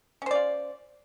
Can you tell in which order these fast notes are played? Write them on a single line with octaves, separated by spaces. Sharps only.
C#4 C5 D5 F4